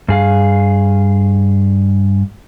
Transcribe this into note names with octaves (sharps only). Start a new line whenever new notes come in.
G2 G#4 F5